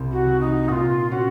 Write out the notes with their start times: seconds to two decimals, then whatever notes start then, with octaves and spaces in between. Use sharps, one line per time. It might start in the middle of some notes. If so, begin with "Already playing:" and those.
Already playing: C2
0.12 F#4
0.26 F#3
0.41 D#4
0.69 A#2 F4 F#4
1.11 C#4 F#4